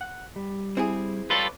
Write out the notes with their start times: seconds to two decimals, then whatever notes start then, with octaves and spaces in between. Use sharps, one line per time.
0.01 F#5
0.36 G3
0.77 C4 E4 G#4
1.30 G3 F4 A4 B4 C#5 D5